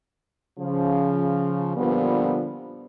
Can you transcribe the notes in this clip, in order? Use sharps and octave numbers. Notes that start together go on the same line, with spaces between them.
C#3 F3
A#2 D3 F3 G3 B3